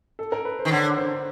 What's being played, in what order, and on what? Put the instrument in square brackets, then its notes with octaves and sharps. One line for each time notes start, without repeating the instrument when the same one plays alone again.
[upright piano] A4
A#4
B4
C5
[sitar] D#3
[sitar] D3 [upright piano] C#5
[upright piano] C5